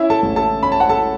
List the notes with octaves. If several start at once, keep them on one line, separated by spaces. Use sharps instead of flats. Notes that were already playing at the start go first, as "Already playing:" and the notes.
Already playing: C#4 E4 E5
A4 A5
A1
A4 A5
C#4 B5
A5
F#5
A4 A5